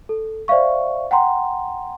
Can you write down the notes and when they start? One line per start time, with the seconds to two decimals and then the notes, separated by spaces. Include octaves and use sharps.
0.09 A4
0.48 C5 D5 E5 F5 C#6
1.11 F#5 G5 A#5 C6